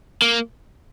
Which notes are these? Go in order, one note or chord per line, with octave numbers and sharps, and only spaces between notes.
A#3